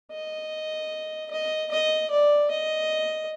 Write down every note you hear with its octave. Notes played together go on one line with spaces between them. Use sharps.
D#5
D#5
D#5
D5
D#5